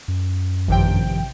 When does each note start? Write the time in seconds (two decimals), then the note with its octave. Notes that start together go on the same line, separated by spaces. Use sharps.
0.08 F#2
0.68 A1 G2 C3 D#3 F3 G5